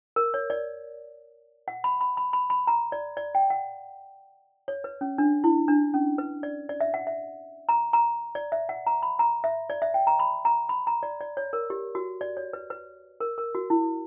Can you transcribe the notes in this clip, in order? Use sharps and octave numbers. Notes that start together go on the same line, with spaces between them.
A#4
C#5
D5
F#5
B5
B5
B5
B5
B5
A#5
D5
D5
G5
F#5
C#5
B4
C#4
D4
E4
D4
C#4
B4
D5
D5
E5
F#5
E5
A#5
A#5
D5
E5
F#5
A#5
B5
A#5
E5
D5
E5
G5
A#5
B5
A#5
B5
A#5
D5
D5
C#5
A#4
G4
F#4
D5
C#5
B4
B4
A#4
A#4
F#4
E4